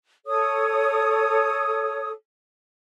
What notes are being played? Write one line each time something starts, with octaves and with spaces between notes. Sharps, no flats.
A4 C#5 D#6